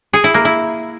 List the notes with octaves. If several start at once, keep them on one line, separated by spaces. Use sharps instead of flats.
G#4
E4
A#3
E4